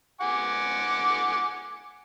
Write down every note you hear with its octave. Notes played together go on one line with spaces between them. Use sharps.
F#5 G#5 D6